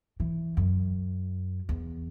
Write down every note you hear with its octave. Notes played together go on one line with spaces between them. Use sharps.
E3
F#2
E2